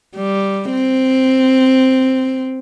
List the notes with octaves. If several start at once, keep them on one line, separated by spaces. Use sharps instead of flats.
G3
C4